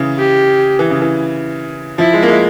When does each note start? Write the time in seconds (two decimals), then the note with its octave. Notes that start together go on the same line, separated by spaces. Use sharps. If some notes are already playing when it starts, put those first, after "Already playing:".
Already playing: C#3 E3
0.19 G4
0.79 E3
0.90 C#3
1.02 E3
1.98 F3 E4
2.13 G#3
2.23 A#3
2.28 G#3